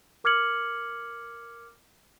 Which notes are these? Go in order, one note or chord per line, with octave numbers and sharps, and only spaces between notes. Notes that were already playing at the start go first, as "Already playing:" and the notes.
A#4 D6 F6 G#6 C#7 F#7